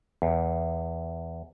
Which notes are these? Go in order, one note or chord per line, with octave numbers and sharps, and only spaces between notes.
E2